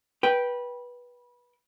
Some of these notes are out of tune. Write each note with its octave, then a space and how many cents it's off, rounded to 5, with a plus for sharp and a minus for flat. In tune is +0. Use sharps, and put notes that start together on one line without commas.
B4 -20 G5 +0